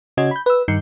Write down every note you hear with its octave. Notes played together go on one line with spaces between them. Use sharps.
C#3 C#4 F#4 D#5 G#6
B5 G6
B4 E6
G2 D#3 D#4 G6 C7 C#7